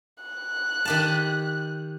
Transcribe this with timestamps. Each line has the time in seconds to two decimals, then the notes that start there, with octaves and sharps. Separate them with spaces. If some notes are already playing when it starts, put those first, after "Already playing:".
0.23 F#6
0.85 D#3 G4 A5